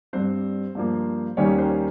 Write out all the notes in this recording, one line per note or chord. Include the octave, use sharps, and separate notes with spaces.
G2 G3 C4 C5
G2 F3 A#3
D#2 D#3 G3 A#3 C#4 C#5
C5